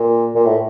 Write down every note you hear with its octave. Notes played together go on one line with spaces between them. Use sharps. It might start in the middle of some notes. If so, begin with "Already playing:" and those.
Already playing: A#2
A#2
A2